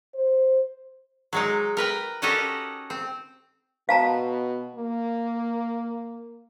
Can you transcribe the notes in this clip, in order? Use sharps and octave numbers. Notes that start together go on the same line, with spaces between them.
C5
F#3 G#3 D#4
A#4 B4 G5
C#4 D#4 F#4 G4 A4 D#5
C4
B2 F5 A5 A#5
A#3